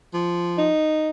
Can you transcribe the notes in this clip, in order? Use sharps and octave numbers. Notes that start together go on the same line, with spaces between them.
F3
D#4